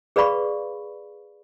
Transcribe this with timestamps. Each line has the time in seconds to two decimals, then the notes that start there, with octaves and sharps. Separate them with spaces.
0.16 G#4 B4 D5 F5 B5 C#6